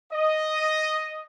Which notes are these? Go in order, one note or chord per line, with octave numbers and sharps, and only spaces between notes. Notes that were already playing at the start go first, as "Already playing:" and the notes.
D#5